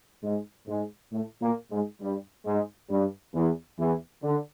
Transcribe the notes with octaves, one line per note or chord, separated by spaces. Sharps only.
G#2 G#3
G#2 G#3
A2 A3
A#2 A#3
G#2 G#3
G2 G3
G#2 G#3
G2 G3
E2 E3
E2 E3
D3